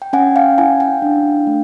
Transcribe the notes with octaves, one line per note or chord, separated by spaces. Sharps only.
G5
C#4 F#5 G#5
F5 G5
E4 F#5 G#5
F5 G5
D4
A3